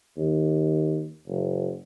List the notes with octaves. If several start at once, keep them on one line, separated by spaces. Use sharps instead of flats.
D#2
F#1